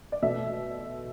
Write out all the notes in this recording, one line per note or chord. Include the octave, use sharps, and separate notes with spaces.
D5
B2 A3 E5